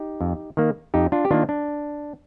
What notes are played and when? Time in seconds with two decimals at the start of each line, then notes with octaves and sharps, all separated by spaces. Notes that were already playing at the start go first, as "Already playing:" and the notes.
Already playing: D#4 G4
0.21 F2
0.57 D#3 A#3
0.94 F2 D#4 G4
1.12 D4 F4
1.25 G4
1.31 D#3 A#3 D4 F4
1.49 D4